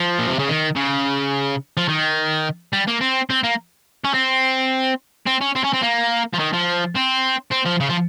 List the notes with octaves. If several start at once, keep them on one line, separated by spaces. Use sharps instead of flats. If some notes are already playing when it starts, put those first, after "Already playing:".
Already playing: F3
A#2
C3
C#3
D#3
C#3
F3
D#3
G3
A#3
C4
C4
A#3
C#4
C4
C4
C#4
C4
C#4
C4
A#3
F3
D#3
F3
C4
C4
F3
C#3
F3